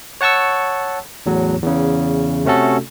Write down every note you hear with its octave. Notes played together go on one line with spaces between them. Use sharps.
C#5 F#5 A5 C#6 E6
E2 A2 F#3
E2 C#3
C3 A3 C#4 F#4 A4